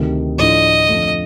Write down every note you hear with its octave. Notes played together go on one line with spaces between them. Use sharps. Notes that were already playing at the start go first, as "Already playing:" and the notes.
Already playing: D2 C3 D#3
A2 F3 A3 D4 F4 D#5
F2 D3 F3 A3